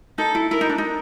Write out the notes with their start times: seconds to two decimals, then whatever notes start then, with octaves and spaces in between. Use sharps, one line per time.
0.18 D#4 A4
0.35 E4
0.51 E4 A#4
0.61 D#4
0.69 D4
0.78 D#4